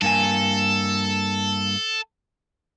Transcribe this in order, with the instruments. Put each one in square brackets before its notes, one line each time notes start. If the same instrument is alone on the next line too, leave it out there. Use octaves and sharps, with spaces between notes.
[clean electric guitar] G2 A#3 G#5 [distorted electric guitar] A4